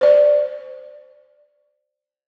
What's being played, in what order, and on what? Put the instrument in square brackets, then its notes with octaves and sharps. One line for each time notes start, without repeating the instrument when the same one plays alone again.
[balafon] C5 D5